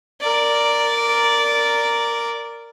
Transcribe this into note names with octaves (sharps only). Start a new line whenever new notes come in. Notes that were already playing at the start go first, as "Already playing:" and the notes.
A#4 D5